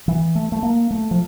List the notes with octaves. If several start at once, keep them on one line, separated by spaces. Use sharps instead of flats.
E3
A3
A3
A#3
A3
F3